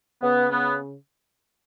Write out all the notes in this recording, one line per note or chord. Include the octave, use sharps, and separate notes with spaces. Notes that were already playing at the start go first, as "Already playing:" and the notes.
C#3 B3
B3